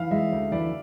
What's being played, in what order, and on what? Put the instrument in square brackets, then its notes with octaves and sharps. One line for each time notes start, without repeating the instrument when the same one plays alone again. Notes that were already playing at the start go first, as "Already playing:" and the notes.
Already playing: [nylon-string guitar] E3 [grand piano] F5
[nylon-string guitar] G#3 [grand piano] E5
[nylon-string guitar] D2
[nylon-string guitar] E3 [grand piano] D5